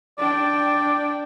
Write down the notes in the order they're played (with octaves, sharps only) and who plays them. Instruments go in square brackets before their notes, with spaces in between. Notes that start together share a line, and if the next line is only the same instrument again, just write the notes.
[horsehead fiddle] D4 G5 [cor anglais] D5